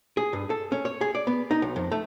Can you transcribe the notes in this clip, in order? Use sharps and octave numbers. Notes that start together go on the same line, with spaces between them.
G#4
G2
A4
C#4
C#5
G#4
D5
B3
D#4
B1
F2
A3